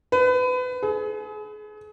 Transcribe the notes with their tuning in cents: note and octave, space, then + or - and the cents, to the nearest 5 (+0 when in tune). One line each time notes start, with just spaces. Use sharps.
B4 +30
G#4 +35